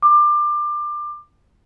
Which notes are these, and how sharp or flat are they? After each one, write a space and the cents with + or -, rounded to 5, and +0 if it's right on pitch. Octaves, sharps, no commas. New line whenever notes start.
D6 +25